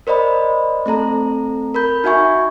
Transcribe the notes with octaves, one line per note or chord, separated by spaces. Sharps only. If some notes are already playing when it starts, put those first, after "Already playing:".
A#4 C5 D5 D#5 B5
A3 C4 A4 A#5
A#4 B5 G6
D#4 F#4 E5 G#5 C#6